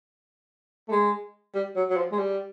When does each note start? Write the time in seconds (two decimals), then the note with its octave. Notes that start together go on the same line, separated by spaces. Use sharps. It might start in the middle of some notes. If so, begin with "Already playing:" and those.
0.88 A3
0.92 G#3
1.55 G3
1.76 F#3
1.90 F#3
1.97 F3
2.12 G#3
2.18 G3